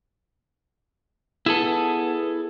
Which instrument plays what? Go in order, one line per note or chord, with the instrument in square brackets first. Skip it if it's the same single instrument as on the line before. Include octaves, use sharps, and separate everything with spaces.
[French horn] B3 [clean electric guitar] E4 G#4 A4